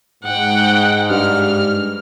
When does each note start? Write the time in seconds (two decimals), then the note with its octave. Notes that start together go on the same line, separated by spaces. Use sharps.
0.24 G#2 F#5 G5
1.11 G2 F6